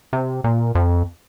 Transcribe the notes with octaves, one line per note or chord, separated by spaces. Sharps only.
C3
A#2
F2